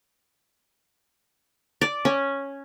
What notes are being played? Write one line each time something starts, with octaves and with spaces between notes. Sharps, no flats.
D5
C#4